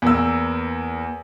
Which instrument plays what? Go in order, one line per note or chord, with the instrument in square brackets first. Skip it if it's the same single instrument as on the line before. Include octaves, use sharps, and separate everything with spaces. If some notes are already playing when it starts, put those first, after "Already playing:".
[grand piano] E2 A#3 E6